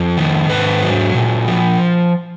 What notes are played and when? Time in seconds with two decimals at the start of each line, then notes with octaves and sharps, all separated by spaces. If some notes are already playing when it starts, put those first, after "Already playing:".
Already playing: F2
0.17 D#3
0.49 G#2 B4
0.82 F#3
1.15 A#2
1.48 F3